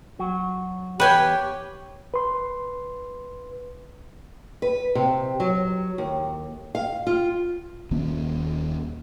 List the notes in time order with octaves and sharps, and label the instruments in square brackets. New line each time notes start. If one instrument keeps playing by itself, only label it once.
[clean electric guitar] F#3 F#4
[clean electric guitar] E2 [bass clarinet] G4 [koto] B4 G#5 [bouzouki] C#5 G5
[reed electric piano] B4 C6
[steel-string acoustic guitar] B4
C3
F#3
D#2
F5
F4
[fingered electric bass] D#1 D#3 A#3 C#4